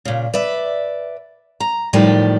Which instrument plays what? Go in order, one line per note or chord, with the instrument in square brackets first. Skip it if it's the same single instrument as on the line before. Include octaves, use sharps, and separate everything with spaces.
[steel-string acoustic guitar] A#2 C#3
B4 D5 E5
A#5
F#2 A2 D#3 F3 G3 G4